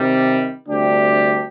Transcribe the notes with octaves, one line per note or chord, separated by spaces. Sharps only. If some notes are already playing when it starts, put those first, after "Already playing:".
Already playing: C3 D#3 G3
D2 C3 G3 D4 G4